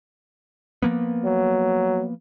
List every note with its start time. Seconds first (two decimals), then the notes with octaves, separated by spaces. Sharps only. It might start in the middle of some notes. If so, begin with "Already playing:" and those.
0.82 F3 A#3 B3
1.25 F#3